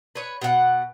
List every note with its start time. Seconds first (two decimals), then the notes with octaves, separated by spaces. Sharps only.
0.15 B4 C#5
0.42 B2 F#5